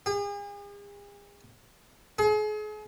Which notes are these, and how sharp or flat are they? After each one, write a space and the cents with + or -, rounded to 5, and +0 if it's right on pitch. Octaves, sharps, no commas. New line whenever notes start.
G#4 -40
G#4 +40